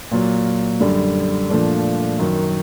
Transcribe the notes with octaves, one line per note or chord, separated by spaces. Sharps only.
A#2 F#3 A#3
F#2 D3 G3
A#2 F3 A3 D4
F#2 D#3 F#3